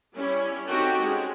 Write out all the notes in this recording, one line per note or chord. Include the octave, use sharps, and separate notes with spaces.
G3 C#4 E4
C4 D#4 F#4 G4 A4 G5
G#3 C#4